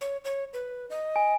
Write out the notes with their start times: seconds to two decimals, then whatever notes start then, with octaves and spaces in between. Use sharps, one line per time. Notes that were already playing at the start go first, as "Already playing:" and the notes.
0.01 C#5
0.25 C#5
0.53 B4
0.90 D#5
1.16 G#5